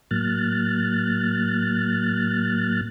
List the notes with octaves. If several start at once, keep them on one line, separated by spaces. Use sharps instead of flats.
A2 F#3 A#3 F6 F#6 A6